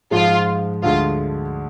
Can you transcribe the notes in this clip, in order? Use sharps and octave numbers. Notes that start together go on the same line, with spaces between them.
G#2 F3 G#3 F4
D2 D3 G#3 F4